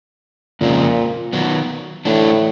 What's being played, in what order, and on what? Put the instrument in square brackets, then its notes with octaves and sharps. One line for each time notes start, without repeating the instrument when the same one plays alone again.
[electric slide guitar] F2 C#3 F3 G#3 C4 [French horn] A#2
[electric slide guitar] D#3 F#3 B3
[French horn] A2 [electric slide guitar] E3 A3 D4